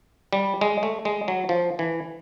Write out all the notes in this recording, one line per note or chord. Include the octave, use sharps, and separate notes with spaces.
G3
G#3
A3
G#3
F#3
F3
E3